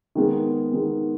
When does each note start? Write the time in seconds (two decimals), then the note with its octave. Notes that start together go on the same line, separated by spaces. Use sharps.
0.15 D#3 G#3 B3
0.72 D#3 G#3 B3